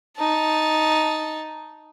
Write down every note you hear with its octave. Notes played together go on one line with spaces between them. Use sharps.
D#4 A5